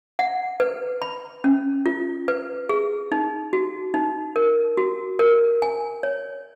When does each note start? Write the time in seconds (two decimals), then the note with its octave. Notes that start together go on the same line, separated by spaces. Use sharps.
0.19 F#5
0.60 B4
1.02 B5
1.44 C#4
1.86 F4
2.28 B4
2.69 G#4
3.12 D#4
3.53 F#4
3.94 D#4
4.36 A#4
4.77 F#4
5.19 A#4
5.62 G#5
6.03 C#5